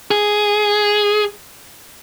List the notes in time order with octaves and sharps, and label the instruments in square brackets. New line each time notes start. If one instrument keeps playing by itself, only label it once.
[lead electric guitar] G#4